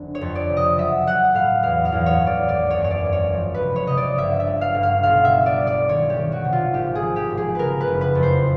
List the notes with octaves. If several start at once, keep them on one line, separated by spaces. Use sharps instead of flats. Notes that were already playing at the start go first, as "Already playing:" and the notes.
Already playing: F1 D3
C#5
F2
D5
C3
D#5
F#3 E5
F#3 F#5
A2 F5
E2 F5
F5
E2
C#5
E2
D5
G#1 D5
C#5
F#2
C#5
D5
G#1
C#5
F3
B4
C3
C#5
C3 D#5
D5
G1 E5
E5
G3
F5
G1
F5
B1 F5
E5
G3
D5
G3
D5
D#3 C#5
G4
D#3
F#4
C3
F4
G#1 G4
G#4
F3
G4
G#1
G#4
C#3 A#4 B4
B4
F#1
B4
F2
C5